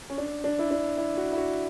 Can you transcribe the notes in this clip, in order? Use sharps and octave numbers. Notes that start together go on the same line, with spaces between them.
C#4
D4
D4
E4
D4
E4
F#4
E4
F#4